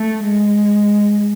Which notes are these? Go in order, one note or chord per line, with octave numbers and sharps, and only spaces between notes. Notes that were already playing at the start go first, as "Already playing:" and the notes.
Already playing: A3
G#3